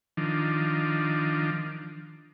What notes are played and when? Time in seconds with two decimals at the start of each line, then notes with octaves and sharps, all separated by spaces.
0.17 D#3 F3 D4